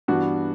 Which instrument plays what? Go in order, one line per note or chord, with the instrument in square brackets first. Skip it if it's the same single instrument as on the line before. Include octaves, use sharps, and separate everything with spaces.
[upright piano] G2 E3 B3 [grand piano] D4 F#4